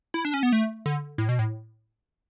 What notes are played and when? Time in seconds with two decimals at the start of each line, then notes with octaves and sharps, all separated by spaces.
0.14 E4
0.25 D4
0.34 C#4
0.43 B3
0.53 A3
0.86 D3
1.18 A2
1.29 B2
1.39 A2